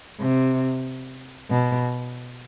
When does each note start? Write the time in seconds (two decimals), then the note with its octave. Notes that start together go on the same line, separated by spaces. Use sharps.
0.20 C3
1.50 B2